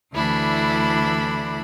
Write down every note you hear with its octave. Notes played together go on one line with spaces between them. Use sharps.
D2 D3 E3 D4 E4 B5